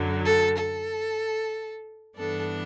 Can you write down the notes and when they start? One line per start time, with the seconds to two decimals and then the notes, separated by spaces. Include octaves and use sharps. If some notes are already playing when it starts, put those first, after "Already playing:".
Already playing: F#2 D3 F#3
0.25 A4
0.58 A4
2.17 G2 E3 B3 D4 A4